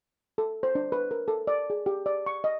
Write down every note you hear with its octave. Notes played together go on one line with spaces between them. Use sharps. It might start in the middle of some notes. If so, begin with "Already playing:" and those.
A4
C5
D4
B4
A#4
A4
D5
G#4
G4
D5
C#6
D#5